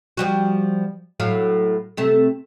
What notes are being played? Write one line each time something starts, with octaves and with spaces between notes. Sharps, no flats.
F3 G3 F#4
A2 F#3 F5
C3 A3